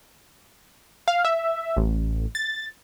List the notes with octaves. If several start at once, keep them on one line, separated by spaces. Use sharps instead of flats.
F5
E5
A1
A6